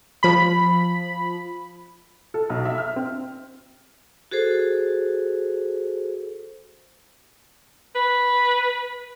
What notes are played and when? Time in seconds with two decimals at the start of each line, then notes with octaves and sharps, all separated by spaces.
0.23 F3 B5
2.34 A4
2.50 B1
2.65 E5
2.78 F6
2.96 C4
4.31 F#4 G#4 A4 C5
7.96 B4